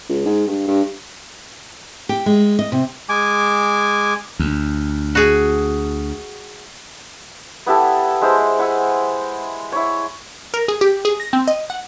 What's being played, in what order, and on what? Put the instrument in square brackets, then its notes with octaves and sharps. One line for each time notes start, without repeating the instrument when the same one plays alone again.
[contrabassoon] C#2
G#2
G2
G2
[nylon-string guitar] G4
G#3
D#5
C3
[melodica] G#3 G#5 D6
[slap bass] D2
[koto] F#4 G#4
[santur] B3 E4 G4 A4
G#3 E4 C5
E4 F#5 G#5 E6
E4 C#5
[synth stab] A#4
G#4
G4
G#4
A#6
C4
D#5
F#5